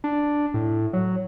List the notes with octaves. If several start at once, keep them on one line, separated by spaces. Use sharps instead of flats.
D4
A2
F#3